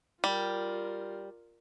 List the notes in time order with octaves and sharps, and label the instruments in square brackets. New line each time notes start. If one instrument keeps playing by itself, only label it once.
[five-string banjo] G3 [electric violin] F4 A#4